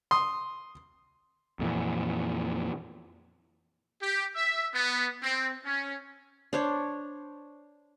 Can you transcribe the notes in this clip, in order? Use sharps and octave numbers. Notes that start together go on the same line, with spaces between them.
C6 D#6
F2 A#2 E3
G4
E5
B3
C4
C#4
D4 C5 C#5